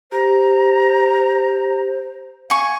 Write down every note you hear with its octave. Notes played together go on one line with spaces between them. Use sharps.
G4 C5 A#5
F5 G#5 C#6